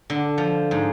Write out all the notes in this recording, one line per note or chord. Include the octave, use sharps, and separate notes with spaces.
D3
F3
G#2